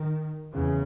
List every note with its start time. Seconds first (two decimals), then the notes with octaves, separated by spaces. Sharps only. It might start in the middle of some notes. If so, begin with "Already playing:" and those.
Already playing: D#3
0.53 E2 C#3